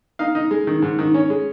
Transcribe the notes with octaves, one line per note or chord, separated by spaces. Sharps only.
D#4 F5
D#4
G#3
D#3
G#2
D#3
C#4
G#3